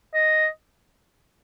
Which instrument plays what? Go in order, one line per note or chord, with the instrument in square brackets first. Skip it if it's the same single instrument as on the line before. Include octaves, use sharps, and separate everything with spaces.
[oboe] D#5